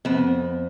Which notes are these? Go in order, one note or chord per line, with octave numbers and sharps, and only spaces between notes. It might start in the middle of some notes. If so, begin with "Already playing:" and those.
F2 B3